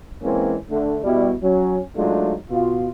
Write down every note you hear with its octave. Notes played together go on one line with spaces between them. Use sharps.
E3 G#3 A#3 C4 C#4
D3 A3
B2 G3 E4
F#3 C#4
F#3 G#3 A3 D4 D#4 F4
B2 F4